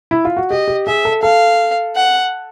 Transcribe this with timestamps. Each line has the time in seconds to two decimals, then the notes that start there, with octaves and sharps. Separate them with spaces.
0.11 E4
0.25 F4
0.37 F#4
0.50 G4 D#5
0.68 G4
0.87 G#4 E5
1.05 A4
1.22 A4 F5
1.96 F#5